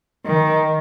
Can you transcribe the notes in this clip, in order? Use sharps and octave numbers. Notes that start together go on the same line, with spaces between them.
D#3